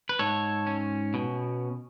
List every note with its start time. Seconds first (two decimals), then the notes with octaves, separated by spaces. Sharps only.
0.09 B4
0.19 G#2 A4 C#5
0.67 C#4
1.14 B2